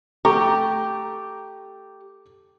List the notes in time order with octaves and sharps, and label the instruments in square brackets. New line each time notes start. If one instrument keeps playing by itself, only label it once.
[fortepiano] A3 A#5 C#6 [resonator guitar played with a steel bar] G4